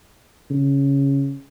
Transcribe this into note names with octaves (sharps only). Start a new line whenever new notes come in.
C#3